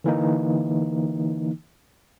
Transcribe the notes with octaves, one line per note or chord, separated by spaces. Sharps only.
D3 E3 A#3 D#4